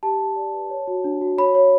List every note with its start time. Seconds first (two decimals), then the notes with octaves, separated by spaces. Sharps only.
0.03 G4 A5
0.20 G4
0.36 D5
0.54 B4
0.70 C#5
0.87 F#4
1.04 D4
1.21 F#4
1.38 C#5 B5
1.55 C#5